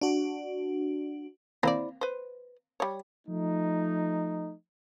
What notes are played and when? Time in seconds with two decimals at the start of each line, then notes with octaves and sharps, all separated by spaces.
0.01 D4 F#4
1.63 A#3 C4 E4 C5 D5 A#5
2.01 B4 C5
2.80 G3 C#5
3.28 F3 A3 D#4